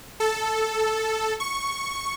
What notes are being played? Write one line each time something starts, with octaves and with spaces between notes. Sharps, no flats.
A4
C#6